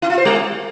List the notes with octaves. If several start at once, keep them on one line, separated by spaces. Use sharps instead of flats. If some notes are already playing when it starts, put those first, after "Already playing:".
E4
F4
C5
G3